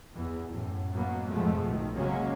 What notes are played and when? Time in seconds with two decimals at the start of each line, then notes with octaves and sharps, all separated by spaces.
0.15 E2 E3
0.51 F#2 A2
0.93 B2 F#3 A#3 B3
1.27 F2 G#2 B2 F3 G#3 A3
1.65 B1 A2 D#3
1.95 C#3 F#3 G#3 A#3 C#4